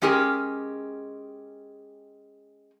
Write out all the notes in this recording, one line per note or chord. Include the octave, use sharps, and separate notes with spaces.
G#3 C#4 G4 G#4 A#4